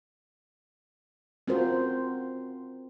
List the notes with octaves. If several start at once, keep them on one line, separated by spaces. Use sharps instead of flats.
C4 C#4 F4 F#4 A#4 C5